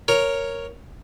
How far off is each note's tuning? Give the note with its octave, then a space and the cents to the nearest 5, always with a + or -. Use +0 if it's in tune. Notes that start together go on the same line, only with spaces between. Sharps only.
A#4 +0 C#5 +0